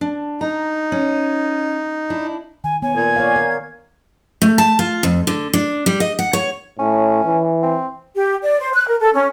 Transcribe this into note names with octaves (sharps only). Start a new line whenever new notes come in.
D4
D#4 A#5
C#4
D4 E4
D#3 G#5
B3 C#5 G#5
A#2 G#6
C#5 D5 F5
A#4
A3
A5
F4
F2
D3
D4
G3
D#5
F#5
C#5
A2 C#4
E3
C4
G4
D5
C5
F#6
A#4
A4
C#4